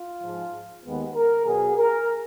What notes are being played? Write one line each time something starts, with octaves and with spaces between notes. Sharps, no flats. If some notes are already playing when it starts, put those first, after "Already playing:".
Already playing: F4
G#2 F3 G#3
D#2 D#3 G#3 B3
A#4
B2 F#3 B3 G#4
A#4